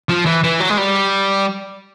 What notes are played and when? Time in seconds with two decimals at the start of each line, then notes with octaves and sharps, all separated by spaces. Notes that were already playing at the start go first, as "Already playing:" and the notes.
0.09 F3
0.26 E3
0.43 E3
0.60 F#3
0.69 G#3
0.77 G3